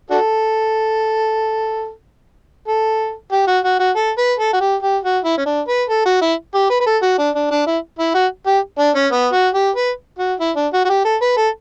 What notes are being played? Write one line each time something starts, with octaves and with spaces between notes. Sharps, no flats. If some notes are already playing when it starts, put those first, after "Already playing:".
D4 F#4 A4
A4
G4
F#4
F#4
F#4
A4
B4
A4
F#4
G4
G4
F#4
E4
C#4
D4
B4
A4
F#4
E4
G4
B4
B4
A4
F#4
D4
D4
D4
E4
E4
F#4
G4
D4
C#4
B3
F#4
G4
B4
F#4
E4
D4
F#4
F#4
G4
A4
B4
A4